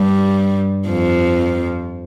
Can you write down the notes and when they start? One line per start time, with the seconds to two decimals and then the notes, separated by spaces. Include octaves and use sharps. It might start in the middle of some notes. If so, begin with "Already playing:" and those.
Already playing: G2 G3
0.88 F2 F3